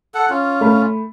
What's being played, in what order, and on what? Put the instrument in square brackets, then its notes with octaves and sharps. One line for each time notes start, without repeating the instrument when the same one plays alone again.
[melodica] A4 F#5
C#4 F4
[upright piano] A3 B5